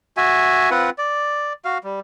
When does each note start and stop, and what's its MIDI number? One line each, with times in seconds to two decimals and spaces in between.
0.17 0.70 66
0.17 0.70 76
0.17 0.70 80
0.71 0.90 60
0.71 0.90 65
0.71 0.90 71
0.71 0.90 78
0.98 1.53 74
1.65 1.78 66
1.65 1.78 77
1.84 2.00 55